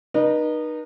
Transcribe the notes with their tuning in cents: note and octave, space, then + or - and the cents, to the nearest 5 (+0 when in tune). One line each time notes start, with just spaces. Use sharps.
D#4 -25 B4 -45